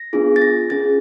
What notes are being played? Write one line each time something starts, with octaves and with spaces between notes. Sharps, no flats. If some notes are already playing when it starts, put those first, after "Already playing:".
Already playing: A#6
B3 D4 F4 G#4
A6
A#6
C#4 F4 G#4 A6